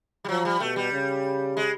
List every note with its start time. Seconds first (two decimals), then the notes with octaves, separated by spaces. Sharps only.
0.24 G3
0.29 F3 F#3
0.45 G3
0.60 B2 A3
0.76 G3
0.92 C#3
1.57 G#3